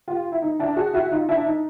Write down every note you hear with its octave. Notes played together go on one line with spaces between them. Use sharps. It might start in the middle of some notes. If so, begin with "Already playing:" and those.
F4 G4
E4
D#4
D4 E4
F#4 G#4
E4 F#4
D#4 F4
D4 E4
D#4